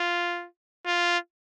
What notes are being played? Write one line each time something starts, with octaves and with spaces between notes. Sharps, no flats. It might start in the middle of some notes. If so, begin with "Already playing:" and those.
Already playing: F4
F4